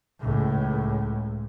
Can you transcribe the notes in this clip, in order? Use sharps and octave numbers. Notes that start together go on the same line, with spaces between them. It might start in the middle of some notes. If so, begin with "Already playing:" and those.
C#2 A2